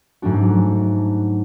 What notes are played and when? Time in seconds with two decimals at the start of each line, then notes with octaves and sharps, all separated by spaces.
0.22 G#2 F#3 A3 D4 F#4